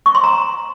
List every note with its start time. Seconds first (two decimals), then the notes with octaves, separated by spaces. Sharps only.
0.06 C#6
0.15 C6
0.24 A#5